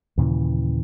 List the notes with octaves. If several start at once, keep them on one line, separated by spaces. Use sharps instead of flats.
D#2 A#2 C#3 E3